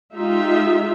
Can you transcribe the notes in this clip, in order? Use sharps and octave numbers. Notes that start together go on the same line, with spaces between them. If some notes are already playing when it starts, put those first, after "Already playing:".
G#3 D#4 F4 G4 E5